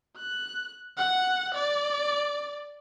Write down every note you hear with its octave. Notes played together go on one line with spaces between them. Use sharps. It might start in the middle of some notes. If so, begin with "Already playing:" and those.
F#6
F#5
D5